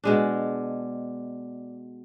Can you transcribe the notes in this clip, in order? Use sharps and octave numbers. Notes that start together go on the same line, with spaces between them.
B2 G#3 D4